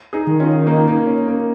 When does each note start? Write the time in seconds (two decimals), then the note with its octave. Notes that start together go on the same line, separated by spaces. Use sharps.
0.13 D#4 G#4
0.27 D#3
0.40 C#4 F4
0.67 A#3 D#4
0.88 A#3 D#4
1.07 C#4
1.28 A#3